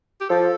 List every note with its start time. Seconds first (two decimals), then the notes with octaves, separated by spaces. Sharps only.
0.21 G4
0.29 F3 F4 A4